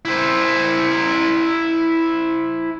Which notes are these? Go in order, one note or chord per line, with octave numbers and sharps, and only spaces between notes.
E4 C5